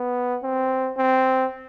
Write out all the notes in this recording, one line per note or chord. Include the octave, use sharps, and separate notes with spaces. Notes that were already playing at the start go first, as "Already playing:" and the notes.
Already playing: B3
C4
C4